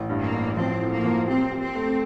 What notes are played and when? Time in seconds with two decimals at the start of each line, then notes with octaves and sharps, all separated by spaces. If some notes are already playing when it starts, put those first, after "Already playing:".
Already playing: A1
0.09 G2
0.22 A#3
0.33 A1
0.57 F3 C4
0.81 A2
0.93 A#3
1.04 F3
1.28 C4 G4
1.52 G4
1.63 C4
1.75 A3